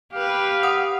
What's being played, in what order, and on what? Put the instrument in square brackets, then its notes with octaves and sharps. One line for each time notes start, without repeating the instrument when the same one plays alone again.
[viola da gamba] G4 B4 [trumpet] F5
[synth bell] F#5 D#6